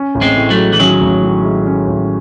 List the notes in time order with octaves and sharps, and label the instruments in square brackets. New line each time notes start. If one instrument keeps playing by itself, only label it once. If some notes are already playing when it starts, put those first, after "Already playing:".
Already playing: [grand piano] C#4
A1
[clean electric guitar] G#3 C4
[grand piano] A2
[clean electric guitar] F#3 A3
[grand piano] G#3
[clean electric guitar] E3
[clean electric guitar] D#3 F#3 [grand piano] C#4
[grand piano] A1
A2
G#3
C#4
A1